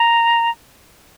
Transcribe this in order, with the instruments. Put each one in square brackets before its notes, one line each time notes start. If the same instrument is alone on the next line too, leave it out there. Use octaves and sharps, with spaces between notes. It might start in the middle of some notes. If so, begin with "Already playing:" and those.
Already playing: [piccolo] A#5